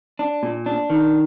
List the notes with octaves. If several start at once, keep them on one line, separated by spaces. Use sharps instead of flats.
D4
A#2
D4
D#3